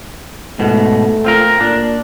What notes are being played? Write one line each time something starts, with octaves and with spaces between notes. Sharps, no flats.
G#2 B2 A3
C4 F4 A#4
A#2 D4